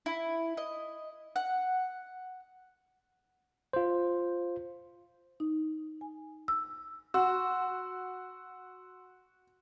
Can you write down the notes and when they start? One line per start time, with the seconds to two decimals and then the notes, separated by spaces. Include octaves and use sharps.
0.06 E4
0.57 D#5
1.36 F#5
3.73 F4 C5
5.40 D#4
6.01 G#5
6.48 E6
7.14 F#4 C6 E6